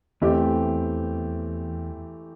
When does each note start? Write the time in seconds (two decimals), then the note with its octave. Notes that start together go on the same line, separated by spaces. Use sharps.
0.22 E2 E3 A3 C4 G4